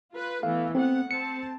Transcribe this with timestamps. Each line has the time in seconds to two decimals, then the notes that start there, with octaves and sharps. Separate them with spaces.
0.13 F4 B4
0.43 E3 A3 B3 F5
0.75 A3 B3 C4 F#5
1.11 C4 A5 C#7